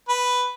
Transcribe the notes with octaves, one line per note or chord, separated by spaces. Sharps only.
B4